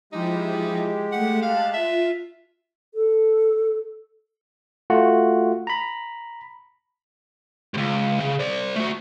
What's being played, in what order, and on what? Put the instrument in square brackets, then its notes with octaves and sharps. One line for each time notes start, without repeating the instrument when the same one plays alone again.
[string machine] F3 E4 [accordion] G#3 G4 [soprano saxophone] D#4
[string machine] A3 [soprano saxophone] F#5
[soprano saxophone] F5 [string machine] A5 F#6
[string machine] F4 [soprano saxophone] E5
[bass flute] A4
[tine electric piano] A3 F4 F#4 F#5
A#5 B5
[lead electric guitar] C#2 G2
C#3
C5 D5
A3 F#4